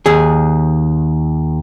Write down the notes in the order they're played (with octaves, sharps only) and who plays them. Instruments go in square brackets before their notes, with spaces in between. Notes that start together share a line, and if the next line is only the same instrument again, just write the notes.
[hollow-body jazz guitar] D#2 G#4